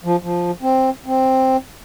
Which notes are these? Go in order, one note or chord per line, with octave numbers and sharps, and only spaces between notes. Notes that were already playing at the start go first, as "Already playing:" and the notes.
F3
F3
C4
C4